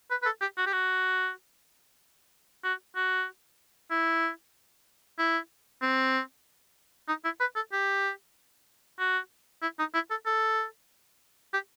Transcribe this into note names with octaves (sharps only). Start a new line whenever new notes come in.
B4
B4
A4
G4
F#4
G4
F#4
F#4
F#4
E4
E4
C4
D#4
E4
B4
A4
G4
F#4
E4
D#4
E4
A4
A4
G4